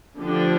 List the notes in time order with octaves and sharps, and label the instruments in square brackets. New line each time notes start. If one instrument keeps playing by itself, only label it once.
[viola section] D3 F3 A3 D4 G4